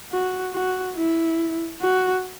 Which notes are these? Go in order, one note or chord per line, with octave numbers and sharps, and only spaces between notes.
F#4
F#4
E4
F#4